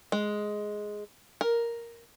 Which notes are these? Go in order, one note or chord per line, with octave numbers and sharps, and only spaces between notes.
G#3
A#4